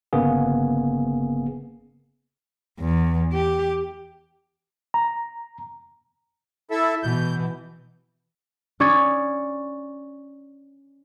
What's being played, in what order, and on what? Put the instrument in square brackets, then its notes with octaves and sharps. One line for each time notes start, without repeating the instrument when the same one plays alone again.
[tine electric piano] G1 C#3 A#3 B3 G#4
[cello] E2
G4
[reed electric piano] A#5
[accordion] E4 A4 E5
[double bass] B2 E3 [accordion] G6
[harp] C#4 D5 C#6 D#6 G#6